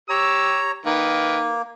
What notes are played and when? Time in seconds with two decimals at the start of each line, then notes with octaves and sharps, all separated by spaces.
0.09 G4 C#5 A#5 E6
0.85 D#3 A#3 B4